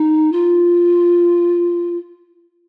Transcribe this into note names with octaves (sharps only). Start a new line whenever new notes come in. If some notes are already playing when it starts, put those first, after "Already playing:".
Already playing: D#4
F4